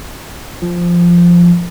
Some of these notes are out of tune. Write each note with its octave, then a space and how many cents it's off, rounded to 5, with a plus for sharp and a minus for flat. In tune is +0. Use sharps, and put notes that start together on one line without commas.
F3 -5